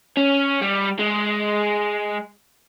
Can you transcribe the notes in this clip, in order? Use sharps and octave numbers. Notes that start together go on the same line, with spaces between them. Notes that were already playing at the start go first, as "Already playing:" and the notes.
C#4
G3
G#3